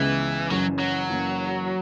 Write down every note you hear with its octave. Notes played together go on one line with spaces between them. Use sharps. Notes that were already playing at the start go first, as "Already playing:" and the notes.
Already playing: C#2 C#3 E3 G#3 B3
F#1 F#2 C#3 E3 F#3
F#3
F#1 F#2 E3 A#3 C#4